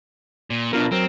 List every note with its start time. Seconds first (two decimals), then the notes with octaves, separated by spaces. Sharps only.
0.50 A#2
0.73 B2 D4 F4 A#4
0.92 F#3 C4 A#4